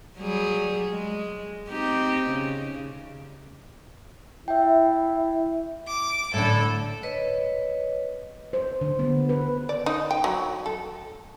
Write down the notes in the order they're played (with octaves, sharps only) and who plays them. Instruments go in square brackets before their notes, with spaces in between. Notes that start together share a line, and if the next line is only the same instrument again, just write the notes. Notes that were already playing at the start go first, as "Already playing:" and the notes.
[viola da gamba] F#3 G3 G#4
G#3
C4 D#4 G4
C#3
[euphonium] E4 [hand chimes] E5 G5
[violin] D6
[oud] A2 D3 [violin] A4
[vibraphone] B4 C#5 D#5
[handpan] C5
D3
B3
B4
[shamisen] D5
D#4
G5
F#3
A4